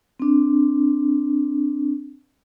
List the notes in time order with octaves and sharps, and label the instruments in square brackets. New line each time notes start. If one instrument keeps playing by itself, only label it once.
[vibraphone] C4 D4